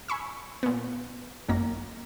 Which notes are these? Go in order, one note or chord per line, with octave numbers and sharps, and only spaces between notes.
G#5 B5 C#6 E6
A#2 B3
G#1 F#2 D#3 A#3 A#6